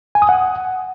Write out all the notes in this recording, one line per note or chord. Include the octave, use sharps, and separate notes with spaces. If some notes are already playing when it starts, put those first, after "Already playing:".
G#5
D#6
F#5